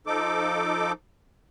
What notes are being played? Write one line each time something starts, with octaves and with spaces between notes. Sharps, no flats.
F3 D#4 A4 D6